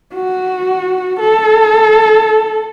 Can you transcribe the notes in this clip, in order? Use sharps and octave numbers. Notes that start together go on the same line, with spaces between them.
F#4
A4